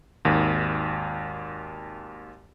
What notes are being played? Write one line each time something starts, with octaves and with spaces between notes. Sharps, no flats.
G#1 D#2